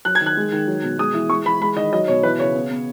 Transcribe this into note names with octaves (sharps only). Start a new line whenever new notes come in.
F#3 F#6
G#6
D#3
F#6
G#3
D#3
F#3
B2
G#3 D#6
E3
G#3 C#6
E3 B5
G#3 B5
D#3 D#5
F#3 D#5
B2 C#5
E3 B4
C#3 C#5
B3
B3